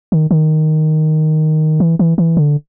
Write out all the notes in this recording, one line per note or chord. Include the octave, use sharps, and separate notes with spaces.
D#3
D#3
E3
E3
E3
D3